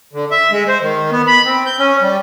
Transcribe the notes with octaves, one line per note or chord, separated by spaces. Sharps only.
D3
E5
G#3
C5
D#3
B3
B5
C4
G6
C#4
G3